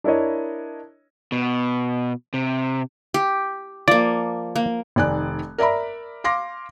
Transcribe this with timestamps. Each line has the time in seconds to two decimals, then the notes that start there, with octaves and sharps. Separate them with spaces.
0.04 D4 E4 A#4 C#5 D#5
1.32 B2
2.34 C3
3.14 G4
3.88 F3 A#3 D5
4.56 A#3
4.96 F1 D#3 D5 G#5 F#6
5.58 A#4 D5 E5 A#5 B5
6.24 F5 C6 D6 A#6